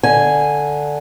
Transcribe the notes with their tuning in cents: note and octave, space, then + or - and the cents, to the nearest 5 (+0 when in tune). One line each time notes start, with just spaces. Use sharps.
D3 +5 G#5 +0